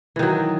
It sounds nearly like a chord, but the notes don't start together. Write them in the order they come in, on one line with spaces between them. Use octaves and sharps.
E3 D#3 F#3